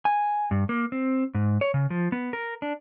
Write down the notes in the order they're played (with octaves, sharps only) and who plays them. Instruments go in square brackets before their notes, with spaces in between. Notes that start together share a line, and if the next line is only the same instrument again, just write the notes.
[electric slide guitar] G#5
G2
A#3
C4
G#2
C#5
C#3
F3
B3
A#4
D4